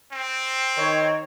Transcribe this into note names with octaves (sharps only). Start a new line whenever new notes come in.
C4
D#3 C#5